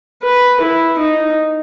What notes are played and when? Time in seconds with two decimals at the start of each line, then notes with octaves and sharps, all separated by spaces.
0.23 B4
0.61 E4
0.99 D#4